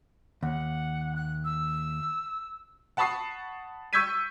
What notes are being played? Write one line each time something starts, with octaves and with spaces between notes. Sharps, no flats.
D#2 F#5
F#6
E6
F#5 A5 B5 C#6 D#6 C7
C#6 E6 G6 G#6 B6 D#7